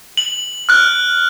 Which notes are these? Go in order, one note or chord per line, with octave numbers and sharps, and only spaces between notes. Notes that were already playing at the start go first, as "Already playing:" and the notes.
F#7
F6 F#6